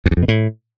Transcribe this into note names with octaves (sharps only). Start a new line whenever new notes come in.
F2
E2
F2
B2
A2